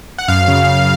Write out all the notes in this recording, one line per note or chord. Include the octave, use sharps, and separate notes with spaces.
F#5
F#2 F5
C#3
F#2